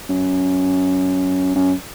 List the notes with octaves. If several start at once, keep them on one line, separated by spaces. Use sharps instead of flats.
F#2
F#2